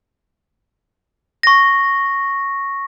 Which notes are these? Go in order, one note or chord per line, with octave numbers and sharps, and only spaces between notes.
C#6 A#6